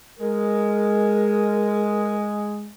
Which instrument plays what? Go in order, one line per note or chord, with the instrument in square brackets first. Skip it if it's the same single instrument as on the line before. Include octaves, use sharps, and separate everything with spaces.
[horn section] G#3 [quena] A#4